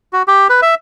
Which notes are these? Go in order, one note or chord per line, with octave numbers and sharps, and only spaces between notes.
F#4
G4
B4
E5